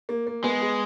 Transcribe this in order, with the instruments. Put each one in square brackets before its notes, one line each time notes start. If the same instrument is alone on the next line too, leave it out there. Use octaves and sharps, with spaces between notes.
[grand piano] A#3
A#3
[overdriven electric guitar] G#3 [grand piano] B3
[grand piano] G#4